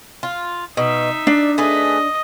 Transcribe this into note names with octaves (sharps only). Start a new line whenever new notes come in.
F4
B2 D#4 E5
D4 D5
A3 G#4 B4 D#5